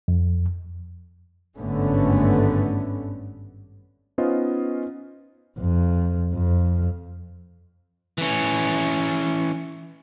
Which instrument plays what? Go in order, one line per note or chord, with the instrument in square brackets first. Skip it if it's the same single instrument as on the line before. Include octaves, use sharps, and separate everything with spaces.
[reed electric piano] F2
[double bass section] G#1 G2 D3 A3 B3 C#4
[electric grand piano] B3 C#4 D#4 F4 C5 D#5
[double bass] F2
F2
[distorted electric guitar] E3 C#4